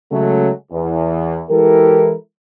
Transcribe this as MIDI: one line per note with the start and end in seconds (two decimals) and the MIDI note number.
0.12 0.49 49
0.12 0.49 54
0.12 0.49 56
0.12 0.49 57
0.72 1.42 40
1.50 2.13 52
1.50 2.13 56
1.50 2.13 64
1.50 2.13 67
1.50 2.13 69
1.50 2.13 70